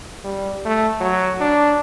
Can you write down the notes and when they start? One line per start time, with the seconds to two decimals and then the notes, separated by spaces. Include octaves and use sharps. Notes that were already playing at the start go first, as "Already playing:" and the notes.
0.24 G3
0.66 A3
1.01 F#3
1.41 D4